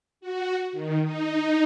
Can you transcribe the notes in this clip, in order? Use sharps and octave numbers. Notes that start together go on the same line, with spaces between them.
F#4
D#3
D#4